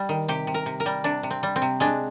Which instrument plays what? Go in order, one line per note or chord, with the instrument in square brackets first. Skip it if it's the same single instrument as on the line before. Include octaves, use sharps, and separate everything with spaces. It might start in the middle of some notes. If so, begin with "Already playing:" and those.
Already playing: [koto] G3
D#3
C3 G4
C3
A#4
C3
A#4
G3
C3 D4
C3
C4
G3
C4
C3
G#3 D4